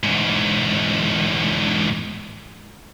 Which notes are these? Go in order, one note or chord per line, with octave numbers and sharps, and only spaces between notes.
E2 G#2